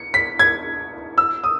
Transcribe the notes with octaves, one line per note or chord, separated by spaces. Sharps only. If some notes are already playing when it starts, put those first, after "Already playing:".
Already playing: C#7
B6
G#6
E6
D#6